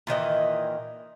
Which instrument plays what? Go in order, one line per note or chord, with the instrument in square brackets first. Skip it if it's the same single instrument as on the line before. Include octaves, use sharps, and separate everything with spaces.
[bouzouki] A#2 D#3 E3 D#5